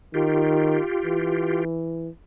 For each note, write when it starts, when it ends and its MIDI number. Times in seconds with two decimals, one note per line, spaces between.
0.14 0.79 51
0.14 1.64 65
0.14 1.64 67
1.04 2.08 52